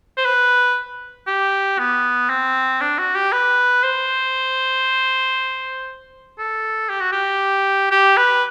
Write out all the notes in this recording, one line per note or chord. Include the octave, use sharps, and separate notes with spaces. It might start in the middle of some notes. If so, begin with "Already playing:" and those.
C5
B4
G4
B3
C4
D4
F#4
G4
B4
C5
A4
G4
F#4
G4
G4
B4